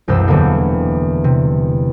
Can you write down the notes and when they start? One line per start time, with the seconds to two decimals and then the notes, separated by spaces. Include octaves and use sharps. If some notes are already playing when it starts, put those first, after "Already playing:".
0.08 E1 C2 F#2 C5 E6
0.27 E2 D3 F#3 G3 A#3 C4
1.24 C3